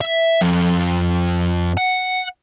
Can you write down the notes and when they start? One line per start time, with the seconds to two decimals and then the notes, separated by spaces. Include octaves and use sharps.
0.01 E5
0.42 F2
1.77 F#5